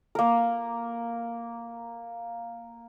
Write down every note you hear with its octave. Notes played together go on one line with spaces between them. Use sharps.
A#3 A#4